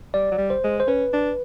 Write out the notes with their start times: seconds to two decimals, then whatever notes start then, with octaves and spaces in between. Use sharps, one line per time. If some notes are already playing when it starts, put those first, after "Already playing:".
0.14 G3 D5
0.31 F#3
0.38 G3
0.50 C5
0.64 G#3
0.80 C5
0.87 C#4 B4
1.13 D4